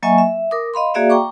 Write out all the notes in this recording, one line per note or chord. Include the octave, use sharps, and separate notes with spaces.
F#3 A#3 D#5 E5 G#5 C#6
E5
A#4 D6 D#6
D#5 F5 B5 C6
A#3 F#4 G#4 D5 E5 F5
G5 A#5 C#6 D6